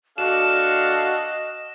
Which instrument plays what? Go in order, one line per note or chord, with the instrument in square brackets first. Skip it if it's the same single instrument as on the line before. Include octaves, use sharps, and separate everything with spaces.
[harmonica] D4 A4 F5 [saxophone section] F#4 [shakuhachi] D#5 [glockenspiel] E7